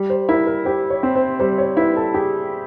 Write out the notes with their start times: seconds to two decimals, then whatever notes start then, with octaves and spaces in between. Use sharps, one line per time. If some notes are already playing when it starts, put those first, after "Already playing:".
Already playing: G3
0.10 C5
0.29 E4 A#4
0.47 A#4
0.65 G4 C5
0.90 C#5
1.03 C4
1.16 C5
1.39 G3 C5
1.58 C#5
1.77 E4 B4
1.96 A4
2.14 G4 G#4